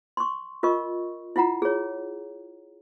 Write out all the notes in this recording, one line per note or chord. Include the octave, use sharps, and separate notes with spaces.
C6 C#6
F4 A#4 D#5 C#6
E4 F4 F#5 A#5
G#4 C#5